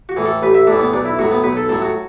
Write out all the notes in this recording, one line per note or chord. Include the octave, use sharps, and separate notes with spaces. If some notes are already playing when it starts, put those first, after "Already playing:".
F#4
A2 E3
A4
A1 B4
E5
A2 E3 D4
B3
B1 D4
E4
A2 F#3 F#4
B3
B1 B4
A4
A2 F#3 A4
F#4